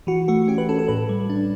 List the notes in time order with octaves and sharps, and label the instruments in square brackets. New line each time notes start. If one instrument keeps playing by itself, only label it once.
[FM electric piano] E3 F#4
A3 F#4
C#4 G4
B4
C#4 A4
A4
A2 B4
G3
D4